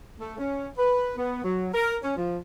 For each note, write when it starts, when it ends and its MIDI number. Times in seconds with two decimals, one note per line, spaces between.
0.20 0.34 57
0.38 0.68 61
0.77 1.12 71
1.17 1.39 59
1.44 1.69 54
1.74 1.95 70
2.02 2.13 61
2.16 2.37 53